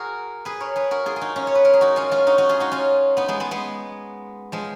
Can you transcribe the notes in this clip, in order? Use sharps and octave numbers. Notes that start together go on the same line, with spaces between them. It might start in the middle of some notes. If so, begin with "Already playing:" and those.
Already playing: F#4 G#4 A#4
G#4 B4
A#4 C#5
G#4 B4
F#4 A#4
F4 G#4
G#4
D#4 F#4
C#4 F4
C#5
B4
A#4
G#4
D#4 F#4
C#4 F4
C#4 F4
D#4 F#4
D#4 F#4
F4 G#4
D#4 F#4
C#4 F4
B3 D#4
G#3 B3
G#3 B3
G#3 B3
F3 G#3